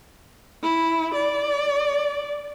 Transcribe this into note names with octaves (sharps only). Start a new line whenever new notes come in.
E4
D5